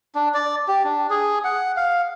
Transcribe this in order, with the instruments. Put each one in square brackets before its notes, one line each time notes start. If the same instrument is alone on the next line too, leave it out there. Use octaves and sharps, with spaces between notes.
[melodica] D4
D5
G4
D4
G#4
F#5
F5